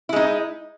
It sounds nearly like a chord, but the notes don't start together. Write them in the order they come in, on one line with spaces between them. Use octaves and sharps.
E4 G#3 D#4